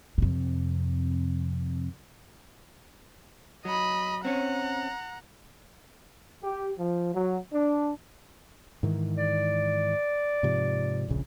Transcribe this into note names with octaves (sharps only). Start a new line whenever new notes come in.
F2 C3
F#3 D#5 B5
C4 C#4 F#5 A#5
G4
F3
F#3
D4
G#2 D#3 E3
D5
G#2 C3 F3
D1 A#1 C#3